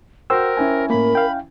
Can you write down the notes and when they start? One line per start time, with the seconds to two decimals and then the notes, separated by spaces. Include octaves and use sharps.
0.30 F#4 A#4 C5 G5 E6
0.57 C#4 E4 G#5
0.90 A2 A#3 A#4 B5
1.15 F5 G5